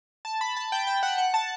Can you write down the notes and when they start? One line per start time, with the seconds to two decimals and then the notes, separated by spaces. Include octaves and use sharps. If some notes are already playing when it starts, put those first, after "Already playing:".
0.25 A5
0.41 B5
0.57 A5
0.72 G5
0.87 G5
1.03 F#5
1.18 F#5
1.34 A5